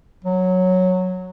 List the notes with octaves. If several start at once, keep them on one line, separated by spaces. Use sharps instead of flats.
F#3